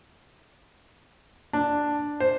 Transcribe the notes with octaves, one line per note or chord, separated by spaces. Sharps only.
D4
C5